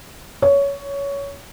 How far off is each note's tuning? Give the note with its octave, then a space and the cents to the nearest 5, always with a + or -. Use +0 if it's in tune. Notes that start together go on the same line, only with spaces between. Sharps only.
C#5 +15